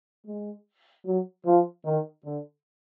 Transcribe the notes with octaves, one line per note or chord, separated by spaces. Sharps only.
G#3
F#3
F3
D#3
D3